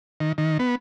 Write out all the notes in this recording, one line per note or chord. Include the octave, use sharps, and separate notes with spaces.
D#3
D#3
B3